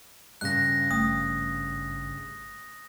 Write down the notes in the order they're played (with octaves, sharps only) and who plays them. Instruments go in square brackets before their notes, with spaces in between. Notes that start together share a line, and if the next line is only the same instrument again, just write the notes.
[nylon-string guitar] G2 C#3 [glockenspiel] F#6 A#6
[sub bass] G#1 [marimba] A3 [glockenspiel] D#6